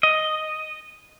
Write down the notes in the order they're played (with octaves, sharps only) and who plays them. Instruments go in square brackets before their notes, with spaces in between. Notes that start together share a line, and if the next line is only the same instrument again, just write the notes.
[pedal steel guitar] D#5